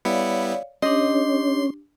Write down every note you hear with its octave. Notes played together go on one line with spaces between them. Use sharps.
G3 B3 E4 C#5 D5 F5
C#4 D4 G4 D#5 C6